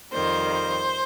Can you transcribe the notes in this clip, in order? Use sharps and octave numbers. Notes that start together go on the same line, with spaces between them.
F2 D#3 G3 C5